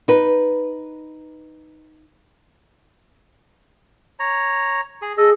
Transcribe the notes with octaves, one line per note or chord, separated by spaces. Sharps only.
D#4 B4
C#5 A#5
G#4
G#4 A4 D#5